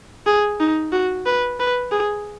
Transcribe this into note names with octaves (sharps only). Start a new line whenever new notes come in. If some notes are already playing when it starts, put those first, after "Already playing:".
G#4
D#4
F#4
B4
B4
G#4